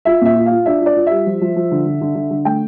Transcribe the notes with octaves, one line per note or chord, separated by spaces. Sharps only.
F4 E5
A#2 E5
F4
F5
F4
D4 E5
F4 D5
F4
G3 E5
F3
F3
F3
D3
D3
D3
D3
D3
A3 G5